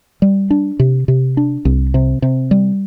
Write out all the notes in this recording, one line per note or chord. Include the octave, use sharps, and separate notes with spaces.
G3
D4
C3
C3
D4
C2
C3
C3
G3